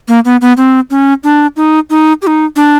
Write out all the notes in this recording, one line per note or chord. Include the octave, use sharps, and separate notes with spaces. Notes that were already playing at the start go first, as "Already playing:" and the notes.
A#3
B3
B3
C4
C#4
D4
D#4
D#4
G4
D#4
D4